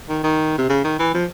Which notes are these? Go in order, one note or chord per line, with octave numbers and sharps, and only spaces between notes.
D#3
D#3
C3
C#3
D#3
E3
F3